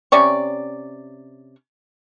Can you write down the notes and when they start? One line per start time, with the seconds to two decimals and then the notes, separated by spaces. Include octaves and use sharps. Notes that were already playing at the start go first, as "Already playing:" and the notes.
0.12 C3 C#4 D5 C#6